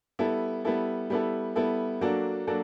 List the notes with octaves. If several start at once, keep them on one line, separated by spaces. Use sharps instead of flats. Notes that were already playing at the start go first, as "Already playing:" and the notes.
G3 B3 E4 A4
G3 B3 E4 A4
G3 B3 E4 A4
G3 B3 E4 A4
F#3 A#3 D4 F#4 A4
F#3 A#3 D4 F#4 A4